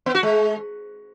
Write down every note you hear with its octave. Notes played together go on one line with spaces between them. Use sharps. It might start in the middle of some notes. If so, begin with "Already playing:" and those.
B3
F#4
G#3